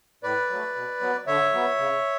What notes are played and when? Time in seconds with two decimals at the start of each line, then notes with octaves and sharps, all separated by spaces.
0.23 A2 B4 D5
0.49 F#3 A3
0.75 B2
1.01 F#3 B3
1.27 D3 C#5 E5
1.52 F#3 B3
1.79 C#3